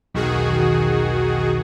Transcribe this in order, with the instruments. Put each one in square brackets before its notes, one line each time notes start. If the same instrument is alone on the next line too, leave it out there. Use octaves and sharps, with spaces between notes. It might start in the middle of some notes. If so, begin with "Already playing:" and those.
[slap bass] B1 E2 [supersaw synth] D#3 F#4 G#4